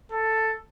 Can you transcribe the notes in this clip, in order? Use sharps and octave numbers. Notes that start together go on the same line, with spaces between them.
A4